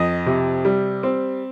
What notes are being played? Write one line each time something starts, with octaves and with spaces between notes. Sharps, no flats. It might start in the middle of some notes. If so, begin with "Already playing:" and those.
Already playing: F2 D#5
C3
G3
C4